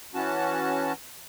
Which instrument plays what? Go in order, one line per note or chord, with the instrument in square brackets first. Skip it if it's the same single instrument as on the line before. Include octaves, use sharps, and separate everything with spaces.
[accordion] E3 C#4 F#4 A5